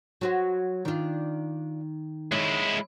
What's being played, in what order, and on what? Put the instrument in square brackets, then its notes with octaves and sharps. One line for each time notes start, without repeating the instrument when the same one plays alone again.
[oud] F#3 F#4 C5
[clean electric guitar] D#3 [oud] D4 F4
[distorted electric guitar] G#3 E4 [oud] C#5